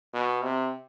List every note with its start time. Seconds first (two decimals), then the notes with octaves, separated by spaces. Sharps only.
0.14 B2
0.42 C3